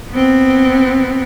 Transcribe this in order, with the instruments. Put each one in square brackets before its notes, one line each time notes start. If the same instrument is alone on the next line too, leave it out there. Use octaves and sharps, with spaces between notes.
[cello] B3 C4